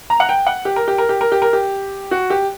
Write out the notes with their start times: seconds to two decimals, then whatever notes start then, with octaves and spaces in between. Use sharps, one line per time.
0.10 A#5
0.20 F#5
0.29 G5
0.47 F#5
0.65 G4
0.76 A#4
0.88 G4
0.98 A#4
1.09 G4
1.21 A#4
1.32 G4
1.42 A#4
1.53 G4
2.11 F#4
2.30 G4